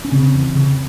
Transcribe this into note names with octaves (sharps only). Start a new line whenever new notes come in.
C#4
C#3 C4
E2
C#3